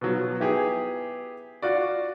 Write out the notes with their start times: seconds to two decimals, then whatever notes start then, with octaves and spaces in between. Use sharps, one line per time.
0.01 B2 F3 F#3
0.39 B3 E4 G4 G#4
1.62 F4 F#4 D5